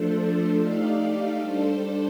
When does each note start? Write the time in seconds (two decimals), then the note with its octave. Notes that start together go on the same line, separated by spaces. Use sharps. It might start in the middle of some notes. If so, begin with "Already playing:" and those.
Already playing: F3 A3 D4 A4 C5
0.56 A3 D#4 G4 D5 F5
1.39 G3 D4 A4 C5